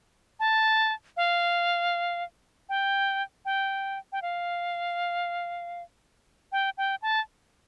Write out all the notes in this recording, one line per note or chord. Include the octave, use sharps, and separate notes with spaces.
A5
F5
G5
G5
G5
F5
G5
G5
A5